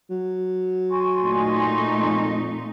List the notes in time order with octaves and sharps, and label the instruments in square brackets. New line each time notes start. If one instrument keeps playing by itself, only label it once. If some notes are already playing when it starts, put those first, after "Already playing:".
[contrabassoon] F#3
[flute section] G#5 C6 C#6
[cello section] A#2 A3 D#4
[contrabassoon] F2